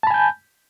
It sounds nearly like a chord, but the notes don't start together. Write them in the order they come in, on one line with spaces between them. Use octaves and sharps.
A5 B5 G#5 G6